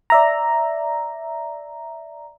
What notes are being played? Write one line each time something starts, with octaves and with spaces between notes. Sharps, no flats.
D5 E5 A#5